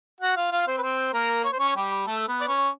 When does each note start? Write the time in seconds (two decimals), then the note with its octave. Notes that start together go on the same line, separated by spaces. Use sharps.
0.21 F#4 F#5
0.36 F4 F5
0.51 F4 F5
0.67 C4 C5
0.78 B4
0.82 C4 C5
1.13 A#3 A#4
1.44 C#5
1.52 C5
1.59 C#4 C#5
1.76 G3 G4
2.06 A3 A4
2.28 B3 B4
2.41 D5
2.47 C#4 C#5